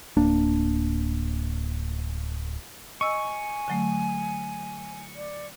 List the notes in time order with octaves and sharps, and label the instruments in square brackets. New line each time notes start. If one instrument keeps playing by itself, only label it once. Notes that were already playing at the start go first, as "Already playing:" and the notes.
[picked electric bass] D1 A#3 D4
[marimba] D#5 E6 [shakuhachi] G#5 [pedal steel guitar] C#6
[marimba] D3 F#3 A3
[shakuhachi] D5